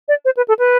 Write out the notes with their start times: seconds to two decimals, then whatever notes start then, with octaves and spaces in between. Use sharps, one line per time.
0.08 D5
0.25 C5
0.37 B4
0.48 A4
0.59 B4